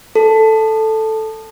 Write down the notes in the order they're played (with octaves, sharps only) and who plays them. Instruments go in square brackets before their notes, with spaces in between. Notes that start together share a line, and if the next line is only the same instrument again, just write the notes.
[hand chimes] A4